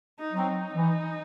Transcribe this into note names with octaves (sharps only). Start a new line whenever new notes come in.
D#4
F#3 C4
D#4
E3